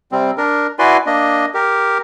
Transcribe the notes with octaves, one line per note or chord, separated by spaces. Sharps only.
C3 G3 C4
D4 A#4
E4 F#4 B4 D5 G#5 C6
A#3 D4 D#5
G4 A#4